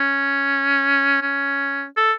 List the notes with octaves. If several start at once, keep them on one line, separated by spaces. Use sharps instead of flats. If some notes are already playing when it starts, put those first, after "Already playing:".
Already playing: C#4
C#4
A4